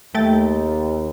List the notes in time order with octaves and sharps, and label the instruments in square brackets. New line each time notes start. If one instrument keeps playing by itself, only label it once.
[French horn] D#2 [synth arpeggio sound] A3 G5 A6